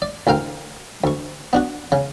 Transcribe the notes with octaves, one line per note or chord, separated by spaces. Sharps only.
D5
A1 D2 A#4 F5 G5
D2 C#6
B3 D4 F#4
C#3